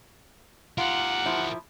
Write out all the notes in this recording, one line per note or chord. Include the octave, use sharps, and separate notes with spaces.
F4 G4 A#4 F#5
F3 E4